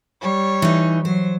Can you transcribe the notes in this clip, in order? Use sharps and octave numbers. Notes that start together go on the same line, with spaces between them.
G3 C#5
E3 D#4
F#3 C5